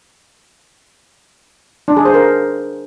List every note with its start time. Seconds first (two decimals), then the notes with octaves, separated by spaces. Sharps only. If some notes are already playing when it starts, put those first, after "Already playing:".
1.88 D4
1.97 G#4
2.05 C5
2.14 A#4